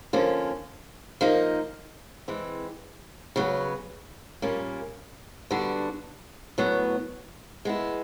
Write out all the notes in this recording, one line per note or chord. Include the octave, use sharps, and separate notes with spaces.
D3 F3 A#3 C#4
F3 A#3 D#4
E3 G#3 C4
C#3 F#3 B3
A#2 G3 A#3 C#4
D3 G3 B3 D4 F#4
A2 F#3 B3
G#3 B3 E4